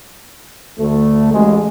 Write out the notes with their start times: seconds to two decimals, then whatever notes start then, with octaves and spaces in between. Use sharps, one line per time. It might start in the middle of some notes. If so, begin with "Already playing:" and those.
0.79 D2 A3
1.33 A1 G#3